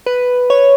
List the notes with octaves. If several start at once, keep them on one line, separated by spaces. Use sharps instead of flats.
B4
C#5